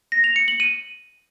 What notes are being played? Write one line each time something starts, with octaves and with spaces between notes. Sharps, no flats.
A#6
F7
C#7
F#7
D#7